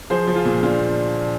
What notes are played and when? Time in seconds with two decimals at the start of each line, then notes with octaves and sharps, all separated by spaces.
0.10 F3 G#4 C5
0.27 F3
0.36 F4 G#4
0.45 A#2
0.63 A#2 D4 F4